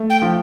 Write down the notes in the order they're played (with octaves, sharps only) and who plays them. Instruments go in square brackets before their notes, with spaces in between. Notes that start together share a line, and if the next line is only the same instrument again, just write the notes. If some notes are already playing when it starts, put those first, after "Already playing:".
Already playing: [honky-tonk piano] A3
[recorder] G5
[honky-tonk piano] F3